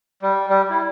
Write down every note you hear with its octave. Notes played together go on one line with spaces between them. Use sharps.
G3
G3
E4